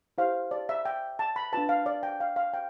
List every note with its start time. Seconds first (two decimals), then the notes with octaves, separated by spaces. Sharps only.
0.18 E4 G4 C5 F5
0.51 D5
0.69 E5
0.85 G5
1.19 A5
1.36 B5
1.53 D4 F4 B4 A5
1.69 F5
1.86 D5
2.03 G5
2.20 F5
2.36 F5
2.54 G5